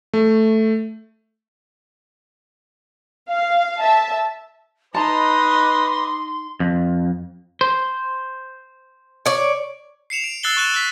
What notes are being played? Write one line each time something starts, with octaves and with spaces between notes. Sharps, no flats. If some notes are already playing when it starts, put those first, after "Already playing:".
A3
F5
E5 A5
D#4 B4 D#5 A5 A#5 C6 D6
F2
C5
C#5 D5
C7 C#7 E7 F7
D7
E6 F#6 A6 C7 F#7 G7
C#6 F#6 E7 F#7
E6 F#6 B6